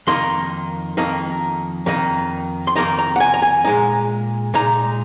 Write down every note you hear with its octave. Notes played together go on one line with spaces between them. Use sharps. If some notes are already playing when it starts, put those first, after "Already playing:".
F2 D#3 A#3 D#4 C6
F2 D#3 A#3 D#4
F2 D#3 A#3 D#4
C6
F2 D#3 A#3 D#4 A#5
A#5
F#5
G#5
A#5
G#5
A#2 G#3 D#4
A#2 G#3 D#4 A#5